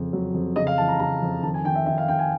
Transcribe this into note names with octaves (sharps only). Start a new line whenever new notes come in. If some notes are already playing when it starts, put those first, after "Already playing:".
Already playing: F2 C#3
F#3
F2
C#3 D#5
F5
E3 A5
A#5
C#3 A#5
F2
D#3 A5
G#5
D#3 G5
E5
D#3 E5
F5
D#3 G5
G#5